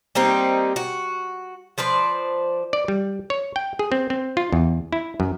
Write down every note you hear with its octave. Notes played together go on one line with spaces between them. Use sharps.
G3 A#3 C4 D#4
F#4
F3 B4 C5 D5
D5
G3
C#5
G5
G#4
C4
C4
F4
E2
E4
F#2